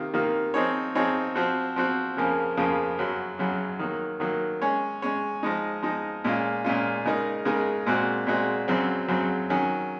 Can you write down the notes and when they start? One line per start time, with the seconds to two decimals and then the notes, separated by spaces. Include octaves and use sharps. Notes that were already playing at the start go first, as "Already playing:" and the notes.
Already playing: C3 D#3 A#3 F4
0.13 C3 D#3 A#3 F4
0.54 F3 C4 D#4 G#4 C#5
0.95 F3 C4 D#4 G#4 C#5
1.35 F3 C4 F#4
1.76 F3 C4 F#4
2.17 F2 C#3 F3 A#3 C#4
2.57 F2 C#3 F3 A#3 C#4
2.99 F#2 C#3 F#3
3.39 F#2 C#3 F#3
3.79 D#3 F#3 A#3
4.20 D#3 F#3 A#3
4.62 G#3 C#4 G#4 C#5
5.02 G#3 C#4 G#4 C#5
5.43 F3 G#3 D#4
5.83 F3 G#3 D#4
6.24 A#2 G#3 C#4 F4
6.64 A#2 G#3 C#4 F4
7.05 C#3 G#3 D#4 A#4
7.45 C#3 G#3 D#4 A#4
7.86 A#2 G#3 C4 F#4
8.27 A#2 G#3 C4 F#4
8.68 F#2 C#3 F#3 C4
9.08 F#2 C#3 F#3 C4
9.49 D#3 F#3 C#4 G#4